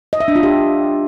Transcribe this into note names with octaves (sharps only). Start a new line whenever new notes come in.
D#5
E5
D4
F4
G4